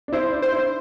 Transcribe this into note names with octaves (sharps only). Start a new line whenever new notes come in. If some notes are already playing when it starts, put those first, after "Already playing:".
D4
E4 C5
D4
C5
E4